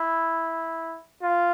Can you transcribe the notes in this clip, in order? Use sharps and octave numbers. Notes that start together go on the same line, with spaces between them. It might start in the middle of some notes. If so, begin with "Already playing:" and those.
Already playing: E4
F4